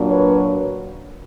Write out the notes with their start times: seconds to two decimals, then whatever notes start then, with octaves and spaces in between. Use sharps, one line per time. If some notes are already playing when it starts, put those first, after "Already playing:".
Already playing: A#2 F#3 A#3 D4
0.09 B4 C#5